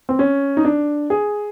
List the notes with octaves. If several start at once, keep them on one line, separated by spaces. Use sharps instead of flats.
C4
C#4
D#4
D4
G#4